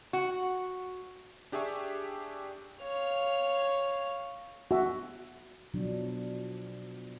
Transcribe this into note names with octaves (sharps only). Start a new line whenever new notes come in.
F#4
D4 G4 G#4 E5 C#6
C#5 F5
F#4 E5
B2 F3 F#3 D4